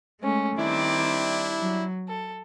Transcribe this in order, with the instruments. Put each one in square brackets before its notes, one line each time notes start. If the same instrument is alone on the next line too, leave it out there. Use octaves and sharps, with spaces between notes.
[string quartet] G#3 A3 C#4
[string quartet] D#3 C4 D6 [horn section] G3 D4 E4
[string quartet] F#3
A4